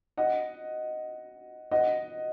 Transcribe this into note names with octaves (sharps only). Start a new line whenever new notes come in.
D#5 F#5
D#5 F#5